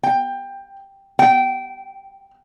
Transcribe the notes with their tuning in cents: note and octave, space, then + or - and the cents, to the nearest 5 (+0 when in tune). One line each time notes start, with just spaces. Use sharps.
G5 +15
G5 -20